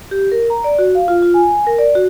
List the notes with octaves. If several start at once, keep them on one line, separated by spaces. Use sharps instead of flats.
G4
A#4
A#5
D5
F#4
F5
F4
F4
G#5
A#4
D5
F#4